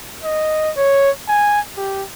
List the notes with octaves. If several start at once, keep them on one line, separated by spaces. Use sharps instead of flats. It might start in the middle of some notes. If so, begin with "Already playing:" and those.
D#5
C#5
G#5
G4